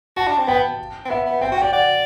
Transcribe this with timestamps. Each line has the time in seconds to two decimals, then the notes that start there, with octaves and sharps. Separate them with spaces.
0.17 F#4 A5
0.27 D4
0.38 C4
0.48 B3 G5
1.05 C4
1.09 B3 E5
1.26 B3
1.41 C4 G5
1.52 F#4
1.57 D5 G5
1.73 D5 F#5